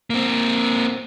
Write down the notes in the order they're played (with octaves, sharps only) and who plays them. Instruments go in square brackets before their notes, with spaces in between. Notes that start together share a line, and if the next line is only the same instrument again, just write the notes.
[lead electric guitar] A#3 C4